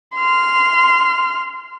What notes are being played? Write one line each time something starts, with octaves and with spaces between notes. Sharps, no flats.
C6 F6